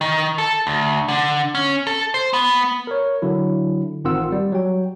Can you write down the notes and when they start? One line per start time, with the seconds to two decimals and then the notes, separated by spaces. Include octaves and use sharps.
0.01 D#3
0.38 A4
0.67 D2
1.08 D3
1.55 C#4
1.87 A4
2.14 C5
2.33 B3
2.87 A#4 C#5
3.22 D3 F#3 E4
4.04 A1 D#3 C4 F4 F#5 E6
4.32 G3
4.52 F#3 G5